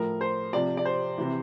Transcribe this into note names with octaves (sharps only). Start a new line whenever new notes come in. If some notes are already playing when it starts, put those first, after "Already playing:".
Already playing: A2 F3 A#4
C5
C3 F3 D5
D5
C5
C3 E3